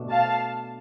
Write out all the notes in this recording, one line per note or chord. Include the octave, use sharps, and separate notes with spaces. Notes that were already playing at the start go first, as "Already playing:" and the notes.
Already playing: B2 A3 D4
F5 A5